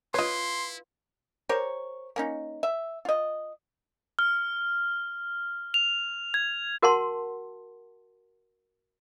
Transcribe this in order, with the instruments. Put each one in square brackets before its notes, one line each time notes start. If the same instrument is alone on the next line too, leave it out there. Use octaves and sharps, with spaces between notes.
[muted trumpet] E4 [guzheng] F4 B4 [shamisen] C#5 D#5 [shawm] C6
[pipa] G4 A#4 C5 C#5
A#3 C#4 D#4
E5
F4 D#5
[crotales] F6
F7
G#6
[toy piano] F#4 A#4 F#5 A5 C6